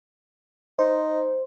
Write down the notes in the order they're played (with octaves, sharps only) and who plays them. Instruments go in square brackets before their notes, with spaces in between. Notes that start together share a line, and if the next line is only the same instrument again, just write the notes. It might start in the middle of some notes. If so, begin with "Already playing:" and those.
[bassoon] D#4 [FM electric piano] C5